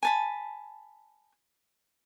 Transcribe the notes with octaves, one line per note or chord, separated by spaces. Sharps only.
G#5 A5 B5